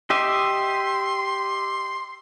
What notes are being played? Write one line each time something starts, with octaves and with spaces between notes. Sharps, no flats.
G4 D#5 E5 C6